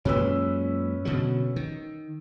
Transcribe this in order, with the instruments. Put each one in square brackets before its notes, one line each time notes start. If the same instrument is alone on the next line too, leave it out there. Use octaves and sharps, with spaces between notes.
[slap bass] F#2 A#2 G#3 [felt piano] C#4 B4 E6
[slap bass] B2 D3 F#3
D#3